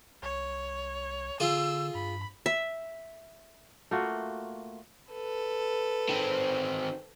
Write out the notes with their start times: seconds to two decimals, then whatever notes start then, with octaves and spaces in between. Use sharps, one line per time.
0.23 C2 C#5
1.40 D3 F4 G#4 E6
1.95 G2 B5
2.46 E5
3.91 A3 A#3 F4 F#4
5.10 A4 B4
6.09 D#3 C4